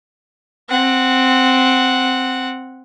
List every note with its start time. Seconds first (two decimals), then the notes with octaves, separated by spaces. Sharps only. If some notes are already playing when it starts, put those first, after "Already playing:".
0.69 C4 F#5